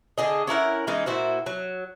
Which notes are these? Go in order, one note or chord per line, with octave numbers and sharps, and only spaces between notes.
D3 G#4 D#5
C#4 E4 A#4 F#5
E3 G#3 C#4 D#4
A#2 E4 F#4 C5
F#3